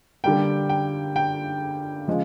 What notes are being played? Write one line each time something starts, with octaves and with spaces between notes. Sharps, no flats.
D3 G3 A#3 G5
G5
G5
C#3 F3 G#3